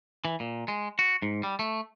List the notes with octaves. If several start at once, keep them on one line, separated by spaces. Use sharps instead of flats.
E3
A#2
G#3
F#4
G#2
G3
A3